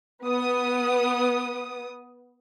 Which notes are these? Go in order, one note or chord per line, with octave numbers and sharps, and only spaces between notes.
B3 D#6